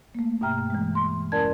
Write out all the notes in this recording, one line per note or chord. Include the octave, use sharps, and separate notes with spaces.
A3 A#3
G2 B2 E5 G5 A#5 F6
E3 G#3
C6
E2 C#4 A#4 D5 A5 G#6